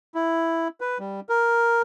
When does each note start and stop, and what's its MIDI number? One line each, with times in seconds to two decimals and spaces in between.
0.15 0.68 64
0.81 0.98 71
0.99 1.20 55
1.29 1.82 70